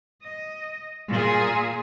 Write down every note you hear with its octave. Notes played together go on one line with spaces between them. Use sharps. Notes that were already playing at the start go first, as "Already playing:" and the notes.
D#5
A#2 G#4